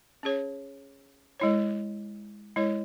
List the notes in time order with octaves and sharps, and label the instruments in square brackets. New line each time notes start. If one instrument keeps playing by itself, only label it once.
[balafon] C#4 G#4 C#5
G#3 E4 C#5
G#3 E4 C#5